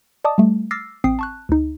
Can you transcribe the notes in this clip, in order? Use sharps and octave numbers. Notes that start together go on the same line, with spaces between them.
D5 D#5 A5 D6 D#6
G3 A3
D6 E6 F6 A6 A#6 C7
A1 C4 G5 D#6 C7
A5 C#6 F#6
D2 D#4